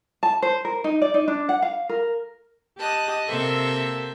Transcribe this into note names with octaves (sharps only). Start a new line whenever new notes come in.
A5
C5
A#4
D#4
D5
D#4
D4
F#5
F5
A#4
G4 D#5 A5 F#6
C3 A#3 A4 C5 E5 G5